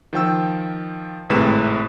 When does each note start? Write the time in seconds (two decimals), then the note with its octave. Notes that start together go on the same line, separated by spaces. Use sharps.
0.13 D#3 F3 G5 E6
1.30 G#1 A2 C3 G#3 B4 E7